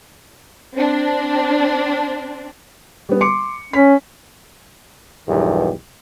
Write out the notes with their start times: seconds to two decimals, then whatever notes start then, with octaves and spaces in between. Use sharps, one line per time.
0.75 C4 D4
3.09 G3 B3
3.21 C6 D6 C#7
3.73 C#4 B6
5.28 B1 E2 G2 D#3 G4